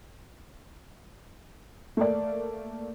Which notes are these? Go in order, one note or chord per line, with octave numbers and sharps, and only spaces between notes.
A3 A#3 D5